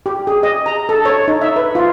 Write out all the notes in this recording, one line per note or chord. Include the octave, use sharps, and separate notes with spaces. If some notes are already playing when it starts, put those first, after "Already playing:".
G4
G#4
D#5
A#5
A4
C#5
D#4
E5
B4
F4